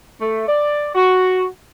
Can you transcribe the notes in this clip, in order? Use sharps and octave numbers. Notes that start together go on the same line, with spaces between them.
A3
D5
F#4